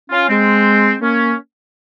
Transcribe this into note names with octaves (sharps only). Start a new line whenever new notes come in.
C#4 F4
G#3 C4
A#3 C#4